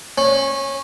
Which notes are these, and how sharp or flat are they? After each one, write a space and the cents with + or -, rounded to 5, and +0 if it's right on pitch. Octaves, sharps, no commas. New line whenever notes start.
C#4 -20